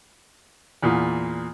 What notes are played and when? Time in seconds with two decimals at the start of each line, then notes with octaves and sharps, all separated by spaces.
0.83 E2 A#2